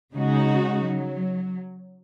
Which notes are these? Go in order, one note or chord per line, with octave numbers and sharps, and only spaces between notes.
C#3 G#3 D#4 F#4
F#3